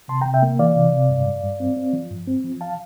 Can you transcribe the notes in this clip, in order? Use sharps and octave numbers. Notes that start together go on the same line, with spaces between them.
C3 A5 C6
G5 A#5
C3
E5 G5
A#3
E3 D5 F5
C3
C3
G2
G2
G2
C4
C4
F3
G2
C4
F3
F5 A5